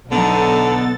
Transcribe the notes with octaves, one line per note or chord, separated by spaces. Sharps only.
B1 D3 F#3 B3 D#4 A4 A6